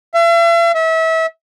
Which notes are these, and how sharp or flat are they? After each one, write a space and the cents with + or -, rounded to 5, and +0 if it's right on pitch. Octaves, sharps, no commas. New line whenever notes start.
E5 +45
E5 -30